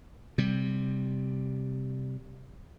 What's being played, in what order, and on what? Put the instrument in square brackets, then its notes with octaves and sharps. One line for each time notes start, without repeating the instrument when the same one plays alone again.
[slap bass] C3 G3